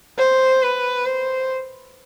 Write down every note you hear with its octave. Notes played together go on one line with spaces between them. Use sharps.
C5
B4
C5